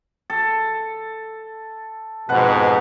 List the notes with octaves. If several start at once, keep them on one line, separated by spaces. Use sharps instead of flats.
A4
F2 G#2 B2 B4 F#5